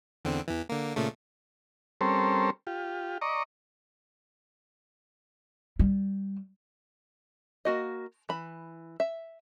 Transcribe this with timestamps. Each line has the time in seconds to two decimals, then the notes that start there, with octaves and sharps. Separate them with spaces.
0.25 E2 D3 C4
0.48 E2 E3
0.69 D3 A#3
0.96 A#2 C#3 A3
2.01 G3 C4 C#4 A4 A#4 C5
2.67 F4 G4
3.21 D5 D#5 A#5 C#6
5.79 G3
7.65 A#3 F#4 D#5
8.29 E3 B5
9.00 E5